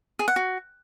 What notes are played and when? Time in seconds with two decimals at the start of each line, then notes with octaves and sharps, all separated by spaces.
0.19 G#4
0.28 F#5
0.36 F#4